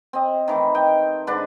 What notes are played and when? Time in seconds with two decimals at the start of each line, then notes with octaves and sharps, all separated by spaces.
0.13 C4 D#5
0.48 D#3 E3 A3
0.74 D#5 G5
1.27 G#2 D3 D4 B4